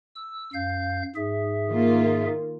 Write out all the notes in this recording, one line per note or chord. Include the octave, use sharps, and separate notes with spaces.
E6
F#2 F5 G6
G#2 G#4 E5
D#3 A#3 F4